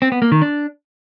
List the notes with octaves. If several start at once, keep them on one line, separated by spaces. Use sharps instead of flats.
C4
B3
A#3
D#3
D4